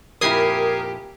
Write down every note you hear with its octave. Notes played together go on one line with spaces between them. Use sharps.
F2 A#2 E4 G4 A#4 D#6 G#6 C7